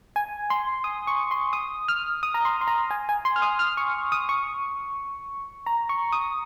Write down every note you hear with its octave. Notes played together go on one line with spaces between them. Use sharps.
G#5
C6
D#6
C#6
C6
D#6
F6
D#6
A#5
C6
C6
A#5
G#5
G#5
C6
F6
D#6
F6
C#6
D#6
C#6
A#5
C#6
D#6